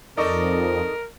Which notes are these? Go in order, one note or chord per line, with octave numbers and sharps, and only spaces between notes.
F2 D#4 A4 A#4 D5 D#5 C#6